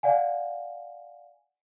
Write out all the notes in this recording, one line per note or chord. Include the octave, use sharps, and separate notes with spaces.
D5 F5 F#5 G#5